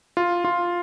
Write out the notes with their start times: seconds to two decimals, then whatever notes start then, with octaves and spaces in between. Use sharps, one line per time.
0.17 F4
0.44 F4